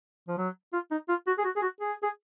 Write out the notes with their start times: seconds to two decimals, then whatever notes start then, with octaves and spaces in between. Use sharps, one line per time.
0.28 F3
0.38 F#3
0.73 F4
0.91 D#4
1.09 F4
1.27 F#4
1.38 G#4
1.44 F#4
1.56 G#4
1.62 F#4
1.81 G#4
2.03 G#4